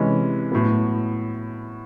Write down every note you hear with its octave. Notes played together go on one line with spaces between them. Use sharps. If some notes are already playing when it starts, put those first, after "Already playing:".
Already playing: C3 E3 G#3 C#4
A2 F#3 B3